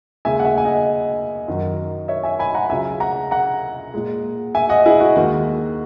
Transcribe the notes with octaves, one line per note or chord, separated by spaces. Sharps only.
D#2 C#3 G#3 E5 G#5
F#5
E5 G#5
G#5
D#5 F#5
F#2 D#3 F#3
C#5 E5
E5 G#5
G#5 B5
F#5 A#5
C#2 C#3 F#3 E5 G#5
F#5 A#5
F#5 A#5
A#2 G#3
E5 G#5
D#5 F#5
E4 G#4
F#4
D#2 D#3 G#3 F#4